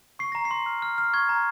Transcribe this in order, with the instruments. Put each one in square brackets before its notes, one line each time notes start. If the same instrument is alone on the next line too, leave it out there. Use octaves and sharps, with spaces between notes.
[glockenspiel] C#6 C7
A#5 A#6
C7
C6
F6
F6
F6
C#6 G#6
A#5